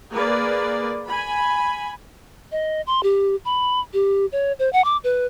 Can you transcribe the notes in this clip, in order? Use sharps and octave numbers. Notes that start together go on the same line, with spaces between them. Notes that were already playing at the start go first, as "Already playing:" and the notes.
A#3 G#4 B4 D5
G#5 B5
D#5
C6
G4
B5
G4
C#5
C5
F#5
D6
B4